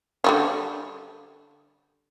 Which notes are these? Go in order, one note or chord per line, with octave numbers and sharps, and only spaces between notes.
D3 G3 C#4